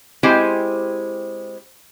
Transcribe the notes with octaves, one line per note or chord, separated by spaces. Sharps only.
G#3 C4 E4 G4 C5 G#5